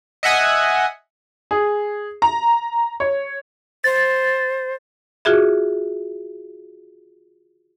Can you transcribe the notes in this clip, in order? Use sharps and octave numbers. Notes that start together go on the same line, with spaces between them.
D#5 E5 F#5 G#5 D#6
G#4
A#5
C#5
C5 A6
F4 F#4 G#4 E5